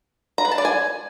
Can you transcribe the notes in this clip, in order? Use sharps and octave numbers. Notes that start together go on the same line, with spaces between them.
A#5
B4
A5
D5
G#5